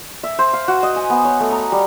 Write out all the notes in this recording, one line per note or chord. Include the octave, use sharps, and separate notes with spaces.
E5
C5
F5
F#4
D#5
G#5
B3
C#5
A3
A#5
G3